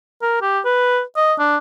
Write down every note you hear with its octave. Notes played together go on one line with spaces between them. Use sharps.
A#4
G4
B4
D#5
D4